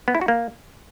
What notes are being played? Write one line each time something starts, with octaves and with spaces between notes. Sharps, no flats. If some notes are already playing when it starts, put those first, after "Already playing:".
B3
E4
F#4
A#3